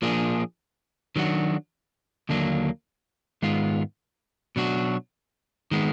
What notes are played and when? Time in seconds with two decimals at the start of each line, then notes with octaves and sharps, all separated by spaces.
0.02 A#2 F3 A#3 D4 G#4
1.16 D#3 F#3 D4 F#4
2.29 D#2 D3 F#3 A#3 D4
3.42 G#2 D#3 G#3 B3 F4
4.56 B2 F#3 D4 F#4
5.71 D#3 G#3 B3